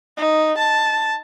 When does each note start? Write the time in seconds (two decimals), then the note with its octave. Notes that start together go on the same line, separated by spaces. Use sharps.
0.17 D#4
0.58 A5